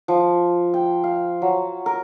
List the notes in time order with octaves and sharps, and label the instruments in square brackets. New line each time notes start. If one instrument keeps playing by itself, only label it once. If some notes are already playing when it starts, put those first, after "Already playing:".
[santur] F3
G5
F5
F#3
A#4